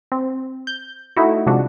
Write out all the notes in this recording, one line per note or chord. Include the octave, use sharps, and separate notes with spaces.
C4
G6
A3 D#4 E4 F#4
C3 F3 G#3 D4 F#4